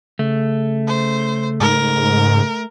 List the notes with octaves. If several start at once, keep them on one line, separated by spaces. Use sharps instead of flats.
C#3 A3
C5
G#2 A#4